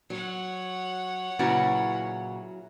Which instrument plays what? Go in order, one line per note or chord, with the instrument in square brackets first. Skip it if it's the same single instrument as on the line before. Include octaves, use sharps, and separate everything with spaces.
[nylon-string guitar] F#3 [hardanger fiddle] C#5 F#5
[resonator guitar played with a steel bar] A#2 C#3 F#4 [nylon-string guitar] F#3 E4 B4